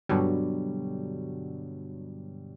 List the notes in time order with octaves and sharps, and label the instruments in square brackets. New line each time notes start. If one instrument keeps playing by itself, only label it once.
[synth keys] G2 B2 D3 F#3 G3